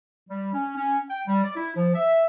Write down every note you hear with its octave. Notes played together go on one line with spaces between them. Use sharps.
G3
C#4
C#4
G5
G3
D5
E4
F3
E5